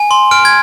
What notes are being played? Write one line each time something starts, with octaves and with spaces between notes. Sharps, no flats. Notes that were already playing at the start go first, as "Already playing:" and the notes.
Already playing: G#5
C6
F6 D7
G#6